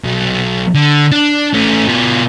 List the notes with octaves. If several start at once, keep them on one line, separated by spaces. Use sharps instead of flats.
B1
D3
D4
A3 C#4
B2 F4